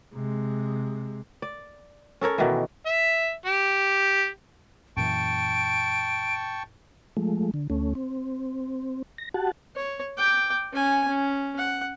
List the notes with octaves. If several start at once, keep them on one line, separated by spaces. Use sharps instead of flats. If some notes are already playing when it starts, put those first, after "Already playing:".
C3 G#3
D5
C#4 A4 A#4 C#5
B2 D#3 E3
E5
G4
F#2 A#2 E3 G5 A5 C#6 D7
F3 G#3 A3
D3
D2 A3 C#4
C4
A#6
F#4 G4 F#5 A5
C#5
G5 D6
C#4 G#5
C#4
F#5